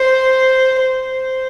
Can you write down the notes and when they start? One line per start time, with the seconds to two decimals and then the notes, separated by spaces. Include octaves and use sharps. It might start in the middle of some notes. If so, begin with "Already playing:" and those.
Already playing: C5
0.82 C5